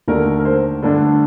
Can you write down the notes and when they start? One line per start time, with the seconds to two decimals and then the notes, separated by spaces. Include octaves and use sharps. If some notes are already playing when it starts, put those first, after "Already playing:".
0.08 D#2 D3 A3 D4 A#4
0.39 A#4
0.45 C5
0.83 G2 D3 A3 D4